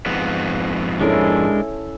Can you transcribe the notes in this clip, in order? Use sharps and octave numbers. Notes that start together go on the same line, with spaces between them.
F2 G#2 B3
G#3 C#4 D4 E4 A4 A#4